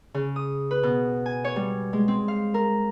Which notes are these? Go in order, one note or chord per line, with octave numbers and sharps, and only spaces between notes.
C#3
D#6
B4
B2
G#5
C#5
G3
G#3
C4
F5
A#4